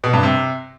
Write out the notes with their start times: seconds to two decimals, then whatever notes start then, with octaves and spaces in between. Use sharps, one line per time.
0.04 B2
0.13 G2
0.23 C3